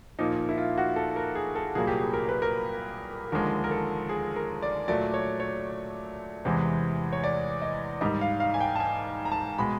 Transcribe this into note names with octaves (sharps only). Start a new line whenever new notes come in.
A#2 F3 A#3 D#4
E4
F4
F#4
A4
A#4
G#4
A4
C2 A#2 F#3 A#3 G#4
G4
G#4
A#4
B4
A#4
D#2 D3 F3 G#3 A#4
A#4
A4
G#4
A#4
D5
A#2 F#3 A3 D5
C#5
C#5
E2 C3 E3 G#3
C#5
D5
D#5
G#2 D#3 G3 D#5
F5
F5
G#5
G5
A5
G#5
A#5
A5
B2 G#3 B5